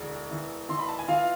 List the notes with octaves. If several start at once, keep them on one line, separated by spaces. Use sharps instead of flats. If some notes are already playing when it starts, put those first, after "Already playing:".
Already playing: E1 D2 E3 G#4
E3
E3 C6
B5
A5
G#5
E3 F4 F5